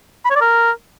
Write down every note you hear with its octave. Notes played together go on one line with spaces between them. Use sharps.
B5
C#5
D5
A#4